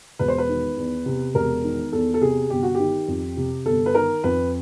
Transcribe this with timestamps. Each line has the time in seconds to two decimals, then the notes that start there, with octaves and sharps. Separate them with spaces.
0.19 E1 B4
0.28 C5
0.38 B4
0.49 D#3
0.77 E2
1.06 C3
1.35 E1 A#4
1.64 D#3
1.92 E2 A4
2.14 A4
2.22 C3 G#4
2.50 G1 G4
2.63 F#4
2.75 D#3 G4
3.08 F2
3.37 C3
3.66 G1 A4
3.86 B4
3.95 D#3 A#4
4.24 F2 B4